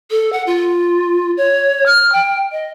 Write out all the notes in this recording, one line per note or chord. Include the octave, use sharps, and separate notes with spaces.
A4
F#5
F4
C#5
F6
G5
D#5